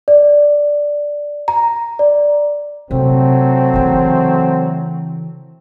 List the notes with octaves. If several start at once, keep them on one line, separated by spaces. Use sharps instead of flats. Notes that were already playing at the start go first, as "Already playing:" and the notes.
D5
A#5
D5
C3 F#3 A3 C4
C#3 E3